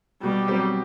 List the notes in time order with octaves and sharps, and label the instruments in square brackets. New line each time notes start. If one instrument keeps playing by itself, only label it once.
[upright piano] B2 [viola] G3
[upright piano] F#3 C4 G4